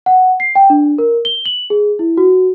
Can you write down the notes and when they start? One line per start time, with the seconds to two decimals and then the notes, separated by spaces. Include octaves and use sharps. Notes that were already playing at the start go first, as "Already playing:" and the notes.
0.06 F#5
0.40 C7
0.55 G5
0.70 D4
0.98 A#4
1.25 G7
1.45 F#7
1.70 G#4
1.99 E4
2.17 F#4